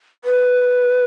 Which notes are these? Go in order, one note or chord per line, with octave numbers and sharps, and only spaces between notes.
B4